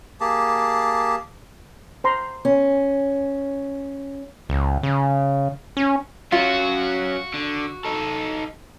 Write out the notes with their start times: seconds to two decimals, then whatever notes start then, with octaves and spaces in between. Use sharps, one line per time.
0.21 A#3 G4 G#4 A5
2.04 C5 A#5 C6
2.45 C#4
4.49 C#2
4.83 C#3
5.77 C#4
6.32 F#3 C#4 F4 F#4
7.34 D3
7.85 D#4 A4